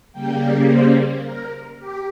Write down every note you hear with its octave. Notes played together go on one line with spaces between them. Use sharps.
C#3 G3 A#3 G5
C5
A#4
G4